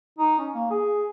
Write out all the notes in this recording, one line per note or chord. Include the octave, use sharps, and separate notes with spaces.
D#4
C#4
A#3
G#4